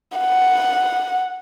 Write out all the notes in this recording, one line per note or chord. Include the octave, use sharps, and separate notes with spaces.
F#5